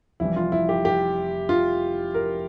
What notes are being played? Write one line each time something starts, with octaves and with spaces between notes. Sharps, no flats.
F1 F2 E3 G3 E4
F4
E4
G4
G4
F4
A#4